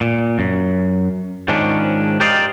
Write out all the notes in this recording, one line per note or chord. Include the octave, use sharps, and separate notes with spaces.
A#2
F#2
G#2 D#3 F3 G#3 C#4 D4
G4 A#4 C5 D5 D#5 F5